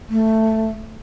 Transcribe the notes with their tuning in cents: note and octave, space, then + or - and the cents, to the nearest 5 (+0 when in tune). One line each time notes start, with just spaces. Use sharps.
A3 +5